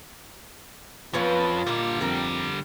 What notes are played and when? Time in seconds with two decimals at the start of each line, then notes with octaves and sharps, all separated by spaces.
1.13 F2 B3 C#4 F4 B4
1.67 A#2 D3 D#3 G3 A#3
2.01 F2 A#4 G5